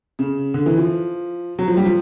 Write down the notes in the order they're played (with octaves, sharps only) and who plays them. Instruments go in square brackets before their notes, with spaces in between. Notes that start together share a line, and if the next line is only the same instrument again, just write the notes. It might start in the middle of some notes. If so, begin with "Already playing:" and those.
[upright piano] C#3
D3
E3
F3
F#3
F3
G3
F3